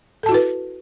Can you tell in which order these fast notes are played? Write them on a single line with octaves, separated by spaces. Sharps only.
A4 A5 F#4 E4 B4